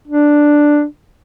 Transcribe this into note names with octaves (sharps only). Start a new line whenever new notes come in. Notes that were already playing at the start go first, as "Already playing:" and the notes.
D4